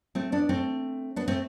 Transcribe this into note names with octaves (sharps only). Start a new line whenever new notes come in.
A3 C4
B3 D4
A3 C4
B3 D4
A3 C4